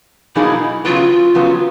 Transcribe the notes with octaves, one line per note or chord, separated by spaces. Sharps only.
B2 F#3 A#3 D#4 E4 G#4
C#3 F#3 B3 F4
C#3 F#3 B3